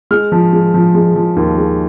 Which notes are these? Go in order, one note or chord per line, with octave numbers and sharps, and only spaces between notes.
G#3 F6
F3
G#3
F3
G#3
F3
D#2
G#3